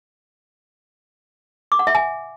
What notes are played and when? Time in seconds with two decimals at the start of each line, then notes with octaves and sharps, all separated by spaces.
1.72 D6
1.79 F#5
1.87 E5
1.95 G#5